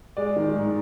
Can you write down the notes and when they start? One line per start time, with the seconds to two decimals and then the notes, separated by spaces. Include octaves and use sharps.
0.17 G#3 D5
0.36 D#3
0.55 G#2